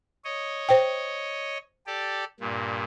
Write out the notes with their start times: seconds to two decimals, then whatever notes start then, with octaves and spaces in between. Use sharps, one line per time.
0.25 C#5 D#5
0.69 C5 G5
1.87 G4 A4 D5
2.40 G2 A#2